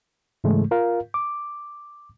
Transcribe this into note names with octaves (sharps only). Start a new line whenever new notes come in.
G#2 C#3 E3 G#3 A3
F4 A#4 F5
D6